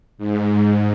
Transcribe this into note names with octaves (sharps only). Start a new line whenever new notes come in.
G#2